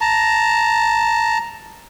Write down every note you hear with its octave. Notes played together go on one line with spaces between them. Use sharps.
A5 A#5